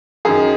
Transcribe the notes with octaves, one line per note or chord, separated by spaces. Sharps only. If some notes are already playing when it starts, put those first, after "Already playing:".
F#2 D#3 G#4